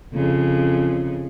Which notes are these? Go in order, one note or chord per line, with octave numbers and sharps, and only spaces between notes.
F2 C#3